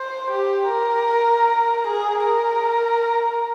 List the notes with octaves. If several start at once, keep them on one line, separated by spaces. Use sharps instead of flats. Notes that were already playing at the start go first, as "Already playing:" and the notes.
Already playing: C5
G4
A#4
G#4
A#4